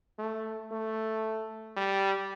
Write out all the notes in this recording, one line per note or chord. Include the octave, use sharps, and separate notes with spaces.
A3
A3
G3